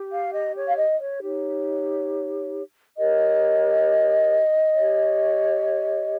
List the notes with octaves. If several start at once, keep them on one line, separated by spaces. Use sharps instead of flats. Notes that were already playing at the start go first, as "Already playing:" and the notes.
Already playing: G4
F5
D#5
C#5
F5
D#5
C#5
D#4 G4 C#5
G4 A#4 C#5 D#5
G4 C#5